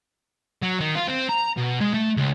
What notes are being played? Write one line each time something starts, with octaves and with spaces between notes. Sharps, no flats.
F#3
D#3
F4
C4
A#5
B2
G#3
A3
C#2